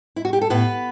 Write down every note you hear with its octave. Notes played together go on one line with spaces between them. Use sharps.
E4
F#4
G4
A4
A2 B3 B4